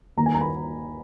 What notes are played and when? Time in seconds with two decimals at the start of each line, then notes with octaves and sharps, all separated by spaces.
0.17 D#2 D#3 A#3 A#5
0.26 G#5
0.34 A#5
0.41 B5